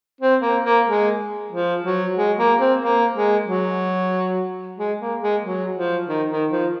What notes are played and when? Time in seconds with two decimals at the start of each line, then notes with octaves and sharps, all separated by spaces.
0.21 C4
0.42 A#3
0.64 A#3
0.86 G#3
1.52 F3
1.84 F#3
2.17 G#3
2.38 A#3
2.59 C4
2.82 A#3
3.14 G#3
3.46 F#3
4.78 G#3
5.00 A#3
5.21 G#3
5.43 F#3
5.75 F3
6.08 D#3
6.30 D#3
6.51 F3